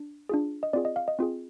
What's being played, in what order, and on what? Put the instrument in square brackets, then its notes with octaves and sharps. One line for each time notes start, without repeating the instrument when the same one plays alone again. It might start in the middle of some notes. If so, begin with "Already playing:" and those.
Already playing: [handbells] D4
D4 F4 G#4
D#5
C4 F4 G#4 D5
D#5
F5
D#5
C4 F4 G#4